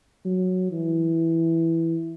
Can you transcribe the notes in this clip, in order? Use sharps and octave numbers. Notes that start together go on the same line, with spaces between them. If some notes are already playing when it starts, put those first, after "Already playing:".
F#3
E3